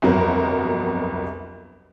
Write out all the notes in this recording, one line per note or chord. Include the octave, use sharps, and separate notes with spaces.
G1 C2 F2 F#3 B3 A#4